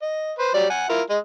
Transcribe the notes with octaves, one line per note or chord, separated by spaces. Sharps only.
D#5
B4 C5
F#3 G3 D5
F#5 G#5
E4 F4 A#4
G#3 D#5